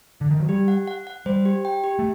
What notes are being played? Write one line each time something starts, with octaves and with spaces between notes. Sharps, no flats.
D3
D#3
F#3
G3 G4
F#5
F#5
F#5
G3 C5
G4
G5
G4
A3